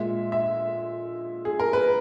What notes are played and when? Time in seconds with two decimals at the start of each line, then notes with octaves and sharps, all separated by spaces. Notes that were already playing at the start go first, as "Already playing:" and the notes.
Already playing: A#2 G#3 E5
0.32 E5
1.45 G#4
1.60 A#4
1.73 B4